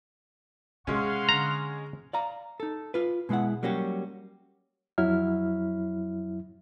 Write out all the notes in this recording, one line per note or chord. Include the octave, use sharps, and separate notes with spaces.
C3 G#3 C#4 F5 F#5 C6
D3 A#5
D5 F5 A#5
D#4 A4
F4 B4
B2 G#3 B3 E4 F#5
F#3 G3 A#3 C#4 F#4 G4
F2 F#3 E4 E5 F6